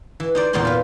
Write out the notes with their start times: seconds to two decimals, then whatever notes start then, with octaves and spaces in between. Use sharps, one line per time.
0.20 E3
0.35 D#4 C5 D5
0.53 E2 A#2 D#4 C5 C6
0.65 F4 B4